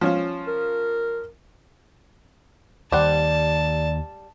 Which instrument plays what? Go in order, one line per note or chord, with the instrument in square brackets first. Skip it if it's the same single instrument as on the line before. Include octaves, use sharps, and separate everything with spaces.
[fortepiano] F3 C#4 F4
[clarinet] A#4
[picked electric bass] D#2 D#3 [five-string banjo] G3 C5 F#5 [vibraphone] D5 [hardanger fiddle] A5